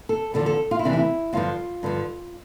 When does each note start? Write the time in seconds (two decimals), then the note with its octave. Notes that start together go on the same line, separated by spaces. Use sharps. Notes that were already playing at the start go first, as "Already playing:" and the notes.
0.09 A4
0.34 E2 D3 F3 A4
0.46 A4
0.71 F4
0.79 E4
0.84 D2 C3 E3 D4
0.93 E4
1.33 G2 D3 F3 F4
1.83 G2 D3 F3